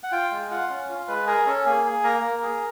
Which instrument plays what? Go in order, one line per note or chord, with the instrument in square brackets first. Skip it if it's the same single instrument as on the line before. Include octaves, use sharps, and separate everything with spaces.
[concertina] F#5
F4 G5
G#3
F4 F#5
C#4
F4
G#3 B4
G#4 A#4
C#4 A4
A#3 G#4
G#4
A#3 A#4
A#3
G#4